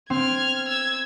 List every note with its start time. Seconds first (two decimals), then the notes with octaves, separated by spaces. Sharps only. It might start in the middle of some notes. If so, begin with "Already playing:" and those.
0.10 C4 F6 G#6
0.68 E6 G#6